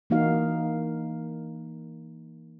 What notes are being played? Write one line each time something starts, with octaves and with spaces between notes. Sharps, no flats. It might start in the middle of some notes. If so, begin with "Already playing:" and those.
E3 A#3 D#4 F#4 F5